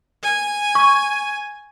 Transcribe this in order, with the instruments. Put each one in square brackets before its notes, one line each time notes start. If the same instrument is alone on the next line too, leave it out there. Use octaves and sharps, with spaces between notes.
[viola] G#5
[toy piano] C#6